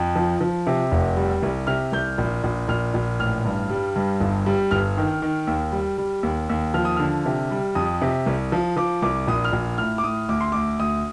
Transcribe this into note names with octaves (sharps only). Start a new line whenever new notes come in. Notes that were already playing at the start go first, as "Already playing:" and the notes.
Already playing: F2
F3
F3
C3
F1
G3
C2
C3 F6
C2 G6
A#1
A#1
A#1 F6
A#1
A1 F6
G2
G3
G2
G1
G3
G1 F6
D#3
D#3
D#2
G3
G3
D#2
D#2
F3 F6
D#6
D3 F6
C3
G3
F2 D#6
C3
C2
F3
F3 D6
C2 D6
A#1 D#6
F6
A#1
A2 F6
D6
A2 D#6
D2 D6
C6
D2 D6
D2 D#6